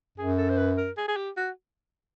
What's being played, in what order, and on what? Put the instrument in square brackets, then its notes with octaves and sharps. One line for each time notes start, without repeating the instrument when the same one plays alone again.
[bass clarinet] F#2 [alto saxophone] G#4
[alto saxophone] A4
C5
B4
A#4
G#4
G#4
G4
F#4